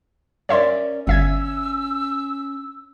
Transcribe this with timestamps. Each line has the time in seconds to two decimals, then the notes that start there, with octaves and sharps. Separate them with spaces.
0.49 C#4 A#4 C#5 D5 E5 C6
1.07 G1 C#4 E5 E6 G#6